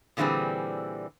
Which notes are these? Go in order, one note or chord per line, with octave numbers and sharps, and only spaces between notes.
A#2 D3 E3 G3 C4 G#4